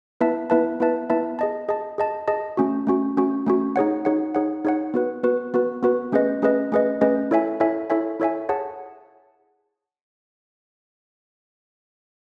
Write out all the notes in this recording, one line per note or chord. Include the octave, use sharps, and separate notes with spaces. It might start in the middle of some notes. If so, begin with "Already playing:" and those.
B3 E4 B4 E5 A5
B3 E4 B4 E5 A5
B3 E4 B4 E5 A5
B3 E4 B4 E5 A5
G#4 D#5 A5
G#4 D#5 A5
G#4 D#5 A5
G#4 D#5 A5
A3 C#4 F#4
A3 C#4 F#4
A3 C#4 F#4
A3 C#4 F#4
D#4 G#4 C#5 F#5
D#4 G#4 C#5 F#5
D#4 G#4 C#5 F#5
D#4 G#4 C#5 F#5
B3 F#4 B4
B3 F#4 B4
B3 F#4 B4
B3 F#4 B4
A3 C#4 G#4 B4 D#5
A3 C#4 G#4 B4 D#5
A3 C#4 G#4 B4 D#5
A3 C#4 G#4 B4 D#5
E4 A4 C#5 E5 G#5
E4 A4 C#5 E5 G#5
E4 A4 C#5 E5 G#5
E4 A4 C#5 E5 G#5
G#4 C#5 F#5 A5